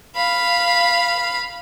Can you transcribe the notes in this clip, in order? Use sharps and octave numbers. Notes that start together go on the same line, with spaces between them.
F5 B5